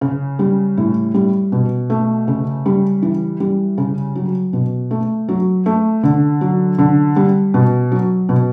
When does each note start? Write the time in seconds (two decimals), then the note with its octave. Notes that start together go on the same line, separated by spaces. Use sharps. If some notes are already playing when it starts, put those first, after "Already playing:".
0.01 C#3
0.39 G3
0.77 A2
1.14 G3
1.52 B2
1.90 A3
2.28 C#3
2.66 G3
3.02 E3
3.40 G3
3.78 C#3
4.15 F#3
4.53 B2
4.91 A3
5.29 F#3
5.66 A3
6.03 D3
6.41 F#3
6.78 D3
7.16 G3
7.54 B2
7.92 F#3
8.29 B2